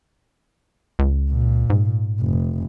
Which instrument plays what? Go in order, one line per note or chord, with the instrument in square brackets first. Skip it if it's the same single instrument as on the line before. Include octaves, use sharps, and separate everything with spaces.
[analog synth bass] C#2
[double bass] A#2
[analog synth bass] G#2
[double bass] F1